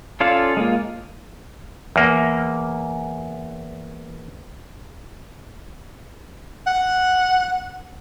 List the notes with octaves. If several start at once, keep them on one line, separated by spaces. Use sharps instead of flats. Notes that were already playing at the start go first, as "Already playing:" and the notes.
C#4 F4 A4 D5 F5
G#3 A#3 F4
E2 A#3
F#5